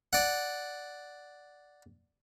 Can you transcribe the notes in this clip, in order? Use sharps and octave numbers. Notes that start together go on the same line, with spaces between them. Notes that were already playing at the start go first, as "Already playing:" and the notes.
D5 F#5